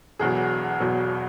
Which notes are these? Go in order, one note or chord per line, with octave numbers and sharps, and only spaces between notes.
E1 E2 B2 F#3 G#4
E1 E2 B2 F#3